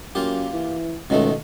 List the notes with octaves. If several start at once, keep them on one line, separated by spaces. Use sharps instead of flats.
F#2 A#3 F4 G4
E3
C#2 B2 D#3 A3